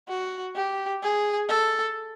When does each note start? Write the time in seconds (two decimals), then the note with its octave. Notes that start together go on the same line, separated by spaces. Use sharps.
0.08 F#4
0.55 G4
1.02 G#4
1.49 A4